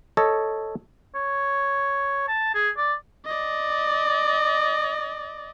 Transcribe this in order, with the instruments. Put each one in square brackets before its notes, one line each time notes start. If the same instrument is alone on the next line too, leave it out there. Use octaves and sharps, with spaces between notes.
[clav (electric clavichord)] A4 C#5 D#5
[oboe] C#5
A5
G#4
D5
[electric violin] D5 D#5